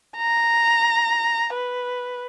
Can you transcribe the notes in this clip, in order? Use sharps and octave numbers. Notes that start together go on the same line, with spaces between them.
A#5
B4